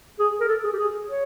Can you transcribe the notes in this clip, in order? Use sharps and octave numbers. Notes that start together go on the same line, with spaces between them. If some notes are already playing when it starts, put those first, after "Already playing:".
G#4
A#4
A4
G#4
G4
G#4
C#5